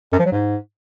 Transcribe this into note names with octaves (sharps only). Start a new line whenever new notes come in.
F#2
F3
F#3
G#2